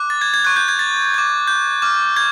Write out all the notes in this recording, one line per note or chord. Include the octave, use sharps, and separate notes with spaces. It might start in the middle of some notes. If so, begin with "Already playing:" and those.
Already playing: D6 F#6
A6
G#6
G#6
C#6 F#6 G#6
G6
G#6
A6
D6 G6
G6
D6 F6
G#6